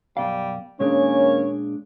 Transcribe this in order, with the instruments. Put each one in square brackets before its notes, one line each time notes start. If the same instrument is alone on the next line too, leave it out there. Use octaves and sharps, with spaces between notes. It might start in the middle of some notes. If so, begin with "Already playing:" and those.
[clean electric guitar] F#2 B2 F5 [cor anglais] G3
[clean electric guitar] A#2 G#3 D4 [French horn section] D#3 A#3 C#4 [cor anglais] C#5